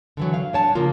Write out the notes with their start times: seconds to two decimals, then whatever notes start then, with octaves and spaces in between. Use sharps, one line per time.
0.17 D3 E3 F#3
0.34 F5
0.53 D4 C#5 A5
0.75 C#3 F3 A#3 F4